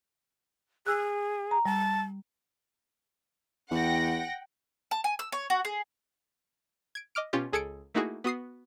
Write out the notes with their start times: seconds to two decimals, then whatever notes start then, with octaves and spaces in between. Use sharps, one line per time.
0.87 G#4 E6 F#6
1.51 A#5
1.65 G3 A5
3.71 E2 F#5 G5 A#6
4.91 A5
5.04 G#5
5.19 E6
5.32 C#5
5.50 F#4
5.65 G#4
6.95 G#6 D7
7.15 D#5 D6 F6 D7
7.33 B2 C#4 F4 G4
7.53 C#2 G#4 A4 G#6 C#7 D7
7.94 A3 A#3 D#4 E4 F#4 G#4
8.24 B3 F#4 D#6 C7